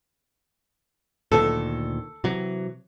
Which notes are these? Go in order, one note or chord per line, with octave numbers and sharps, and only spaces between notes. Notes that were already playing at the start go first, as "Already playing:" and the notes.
D2 A#2 D#3 A4
C3 E3 F#3